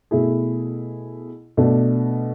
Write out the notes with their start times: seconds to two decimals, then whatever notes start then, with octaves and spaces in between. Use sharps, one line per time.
0.11 B2 A3 E4 G#4
1.57 B2 A3 D4